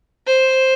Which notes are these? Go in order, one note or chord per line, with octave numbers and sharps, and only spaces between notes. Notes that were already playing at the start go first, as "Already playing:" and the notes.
C5